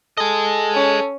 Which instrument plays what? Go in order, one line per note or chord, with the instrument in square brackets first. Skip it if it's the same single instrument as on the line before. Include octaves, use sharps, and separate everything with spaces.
[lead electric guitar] G#4 D#5 [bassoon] A4
[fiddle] C#4